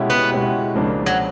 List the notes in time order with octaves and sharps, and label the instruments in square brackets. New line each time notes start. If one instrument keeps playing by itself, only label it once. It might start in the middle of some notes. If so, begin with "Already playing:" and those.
Already playing: [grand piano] B2 G#3 C#4 E4 G4
[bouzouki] B3
[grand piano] B2 G#3 C#4 E4 G4
C#2 C#3 F3 A#3 D4
[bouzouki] F#3